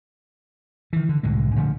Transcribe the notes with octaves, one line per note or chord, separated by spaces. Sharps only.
D#3 E3
D3
C2 A2 D3 G#3
A#2 D3 F3 A3